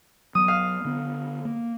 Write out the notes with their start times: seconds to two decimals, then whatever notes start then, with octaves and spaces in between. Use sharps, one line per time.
0.35 F#3 B3 D#6
0.48 F5
0.85 D3 B3
1.45 A#3